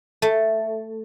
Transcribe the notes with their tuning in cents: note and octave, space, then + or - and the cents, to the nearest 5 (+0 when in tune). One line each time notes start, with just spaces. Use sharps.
A3 +5